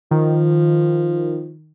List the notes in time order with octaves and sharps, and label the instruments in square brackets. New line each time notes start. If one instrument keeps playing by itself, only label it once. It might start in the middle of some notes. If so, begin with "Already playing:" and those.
[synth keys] D#3 [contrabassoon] F3